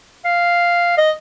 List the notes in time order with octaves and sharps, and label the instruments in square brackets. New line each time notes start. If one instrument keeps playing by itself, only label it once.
[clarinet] F5
D#5